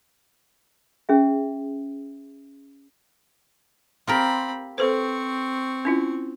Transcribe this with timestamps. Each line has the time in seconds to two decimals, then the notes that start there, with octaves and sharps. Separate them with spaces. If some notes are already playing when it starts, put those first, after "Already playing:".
1.09 C#4 G#4 E5
4.07 C4 F4 G4 A#4 B5
4.78 C4 A4 B4 C5 C#6
5.85 C#4 E4 F4